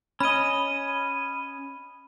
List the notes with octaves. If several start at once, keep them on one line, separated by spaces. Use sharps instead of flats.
C#4 D#5 B5 D#7